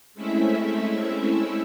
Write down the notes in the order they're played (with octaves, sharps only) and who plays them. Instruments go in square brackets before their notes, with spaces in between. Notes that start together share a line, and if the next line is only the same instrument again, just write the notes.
[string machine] G#3 A3 C4 C#4 E4 E5